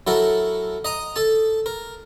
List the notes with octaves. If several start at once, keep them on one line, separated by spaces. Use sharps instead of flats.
F#3 E4 A4 A#4
D#5 A#5 D#6
A4 A5
A#4